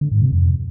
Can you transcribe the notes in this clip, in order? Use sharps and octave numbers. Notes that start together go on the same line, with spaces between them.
D3
G#2
C3
F2